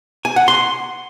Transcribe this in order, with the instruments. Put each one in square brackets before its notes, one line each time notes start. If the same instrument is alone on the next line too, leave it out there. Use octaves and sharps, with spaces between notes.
[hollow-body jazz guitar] G#5
F#5
C6